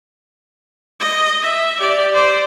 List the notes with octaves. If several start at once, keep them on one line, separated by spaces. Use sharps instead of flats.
D#5
E5
G4 D5
C5 D5